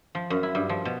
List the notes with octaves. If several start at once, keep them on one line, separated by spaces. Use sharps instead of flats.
F3
F#2
E4
G2
F3
B2